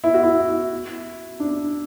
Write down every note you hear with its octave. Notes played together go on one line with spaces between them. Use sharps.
E4
F#4
E4
D4